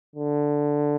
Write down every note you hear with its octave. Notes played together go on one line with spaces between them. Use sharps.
D3